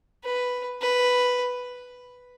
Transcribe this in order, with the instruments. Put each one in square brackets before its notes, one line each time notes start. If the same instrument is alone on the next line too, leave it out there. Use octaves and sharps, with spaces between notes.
[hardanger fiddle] B4
B4